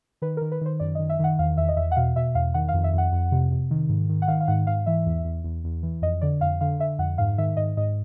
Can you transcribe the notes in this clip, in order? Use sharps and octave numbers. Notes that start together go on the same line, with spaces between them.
D#3 B4
A#4
D#3
B4
D#3 C5
F#2 D5
D#5
D#3
E5
D#3 F#5
E2 F5
E2 E5
D#5
E2 E5
F#5
B2 F5
B2 E5
E2 F5
D#3 F#5
F5
F2
E5
F2 F#5
F2
C3
C3
D#3
G#2
D#3
F#5
D#3 F5
F5
G#2 F#5
G#2 F5
E3 E5
E2
E2
E2
E2
E3
F2 D#5
D3 D5
F2 F5
D3 F5
D3 E5
F2 F#5
G#2 F5
D#3 E5
G#2 D#5
G#2 D#5